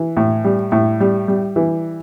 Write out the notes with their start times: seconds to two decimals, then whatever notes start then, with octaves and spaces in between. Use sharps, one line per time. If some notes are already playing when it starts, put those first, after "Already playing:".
Already playing: E3
0.17 A2
0.44 G3
0.72 A2
1.00 G3
1.28 G3
1.56 E3